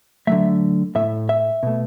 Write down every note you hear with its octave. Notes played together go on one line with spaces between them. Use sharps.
D3 F#3 A3 E5
A2 A3 E5
E5
B2 A3